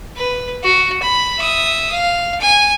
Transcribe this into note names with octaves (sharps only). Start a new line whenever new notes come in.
B4
F#4
B5
E5 D#6
F5
G#5